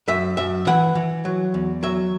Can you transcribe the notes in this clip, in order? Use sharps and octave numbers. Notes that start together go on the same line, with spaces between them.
F#2 E5
F#2 E5
E3 F#5
E3
F#3
E2
F#3 E5